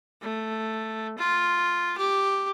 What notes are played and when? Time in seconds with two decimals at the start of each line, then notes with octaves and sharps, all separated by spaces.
0.21 A3
1.18 F4
1.97 G4